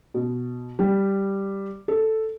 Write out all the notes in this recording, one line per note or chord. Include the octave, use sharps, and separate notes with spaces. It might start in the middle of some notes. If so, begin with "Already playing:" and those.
B2
G3
A4